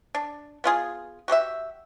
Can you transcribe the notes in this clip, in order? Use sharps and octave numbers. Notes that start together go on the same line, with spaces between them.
D4
B3 F4 G#4
F#4 G4 C5 E5